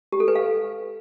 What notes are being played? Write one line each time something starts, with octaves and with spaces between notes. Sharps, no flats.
G4
A4
B4
F5